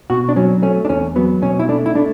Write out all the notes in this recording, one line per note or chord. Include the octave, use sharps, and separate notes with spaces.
B2 F#4
D4
F#3 C#4
A3 C#4
D4
E2 C#4
F#3 B3
B2 C#4
E4
A3 D4
E4
A3 D4